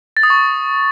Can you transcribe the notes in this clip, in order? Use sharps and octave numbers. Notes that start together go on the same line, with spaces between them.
A6
D#6
C#6